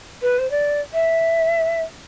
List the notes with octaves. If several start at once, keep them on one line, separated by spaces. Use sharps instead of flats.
B4
C5
D5
E5